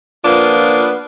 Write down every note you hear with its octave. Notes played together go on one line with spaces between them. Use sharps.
F3 A#3 B3 D4 F4 B4